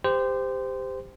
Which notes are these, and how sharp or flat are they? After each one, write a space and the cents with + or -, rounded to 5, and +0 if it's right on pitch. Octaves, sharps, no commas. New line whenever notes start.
G4 +20 C5 -20